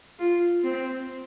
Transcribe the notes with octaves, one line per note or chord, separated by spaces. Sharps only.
F4
C4